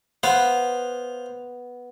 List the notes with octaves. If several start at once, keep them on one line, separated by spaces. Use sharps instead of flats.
B3 C5 F5